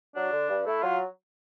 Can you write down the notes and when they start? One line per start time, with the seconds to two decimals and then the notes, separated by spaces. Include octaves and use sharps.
0.16 F#3 D4
0.32 D3
0.49 G2
0.66 A3 E4
0.83 F#3 F4